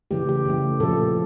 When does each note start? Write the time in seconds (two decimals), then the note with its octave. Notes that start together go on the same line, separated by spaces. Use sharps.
0.11 C#3 E3 A3 G4
0.29 G4
0.45 C#3 E3 A3
0.80 A#2 F3 A3 A4